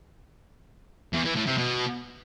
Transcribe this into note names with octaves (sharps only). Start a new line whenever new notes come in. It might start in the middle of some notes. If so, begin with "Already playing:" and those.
E2
E3
A2
C3
B2